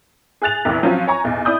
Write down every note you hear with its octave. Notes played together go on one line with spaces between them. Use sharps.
G#4 G#5 F#6 A6 F7
F1 A#1 E2 E3
F3 F#3 C4 C#4 F4
C#5 G#5 A#5 C#6
B1 E2
E4 D5 D#6 G6